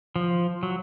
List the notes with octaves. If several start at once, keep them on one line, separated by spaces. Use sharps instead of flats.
F3
F#3